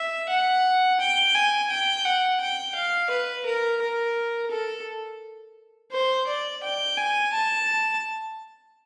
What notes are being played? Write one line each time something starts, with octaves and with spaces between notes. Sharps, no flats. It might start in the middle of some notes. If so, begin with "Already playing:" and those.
Already playing: E5
F#5
G5
G#5
G5
F#5
G5
F5
B4
A#4
A#4
A4
C5
D5
G5
G#5
A5